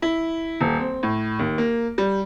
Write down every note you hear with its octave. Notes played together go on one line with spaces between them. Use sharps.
E4
D#1
C4
A2
D#2
A#3
G3